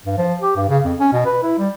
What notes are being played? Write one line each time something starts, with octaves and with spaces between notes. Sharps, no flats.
G2
F3
G4
G2
C#3
F2
C#4
B2
B4
E4
G3